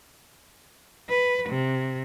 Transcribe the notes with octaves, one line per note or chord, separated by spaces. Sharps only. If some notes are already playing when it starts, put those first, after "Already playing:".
B4
C3